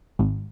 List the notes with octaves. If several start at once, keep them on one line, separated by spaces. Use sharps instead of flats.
G#1